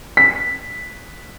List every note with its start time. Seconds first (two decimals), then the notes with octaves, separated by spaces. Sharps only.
0.17 B6